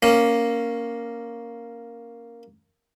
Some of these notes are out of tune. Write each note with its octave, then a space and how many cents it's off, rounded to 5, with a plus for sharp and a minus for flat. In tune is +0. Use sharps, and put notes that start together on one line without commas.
A#3 +0 C#4 +0